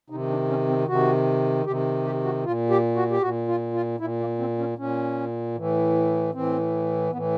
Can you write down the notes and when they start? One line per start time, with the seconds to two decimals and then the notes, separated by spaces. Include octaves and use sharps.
0.10 C3 D#3 D#4
0.30 D4
0.49 C#4
0.68 C4
0.88 C3 D#3 F#4
1.66 C3 D#3 G4
2.05 G4
2.25 F#4
2.44 A#2 F4
2.70 G4
2.96 F#4
3.11 G4
3.22 A#2 F#4
3.48 F4
3.74 F4
4.00 A#2 E4
4.20 A#3
4.39 C4
4.59 C#4
4.78 A#2 C#4
5.56 A2 E3
6.34 A2 E3 C4
7.12 A2 E3 B3